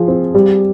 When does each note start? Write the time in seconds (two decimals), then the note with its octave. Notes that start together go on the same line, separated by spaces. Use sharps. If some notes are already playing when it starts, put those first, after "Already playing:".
Already playing: F3 F4 G#4
0.08 C4
0.35 G3